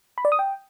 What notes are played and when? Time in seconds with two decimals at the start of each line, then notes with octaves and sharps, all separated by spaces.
0.18 B5
0.25 D5
0.32 D#6
0.39 G5